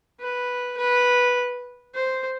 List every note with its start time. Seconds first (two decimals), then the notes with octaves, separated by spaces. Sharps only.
0.20 B4
0.77 B4
1.95 C5